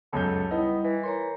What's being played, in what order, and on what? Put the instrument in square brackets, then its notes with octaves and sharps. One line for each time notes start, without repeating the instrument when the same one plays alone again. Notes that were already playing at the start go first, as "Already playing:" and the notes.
[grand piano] C#2 F#2 G6 [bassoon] A4 [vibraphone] C#5
[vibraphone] G3 E4 [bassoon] B3 [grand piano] D#4
[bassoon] E3
[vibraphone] A#4 C#5 A#5 [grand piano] C6